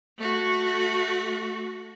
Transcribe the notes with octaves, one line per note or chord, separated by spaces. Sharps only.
A3 F#4